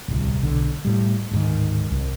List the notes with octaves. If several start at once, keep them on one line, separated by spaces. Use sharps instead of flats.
D1 C2
B1 D3
A2 G3
D1 G#2 D#3
C2